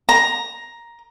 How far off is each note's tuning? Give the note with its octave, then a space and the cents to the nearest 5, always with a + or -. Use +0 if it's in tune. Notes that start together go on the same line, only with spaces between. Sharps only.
A#5 +10